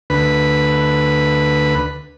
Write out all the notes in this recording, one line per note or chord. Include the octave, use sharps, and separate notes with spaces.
D2 B4